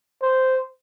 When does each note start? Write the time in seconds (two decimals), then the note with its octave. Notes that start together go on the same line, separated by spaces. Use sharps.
0.22 C5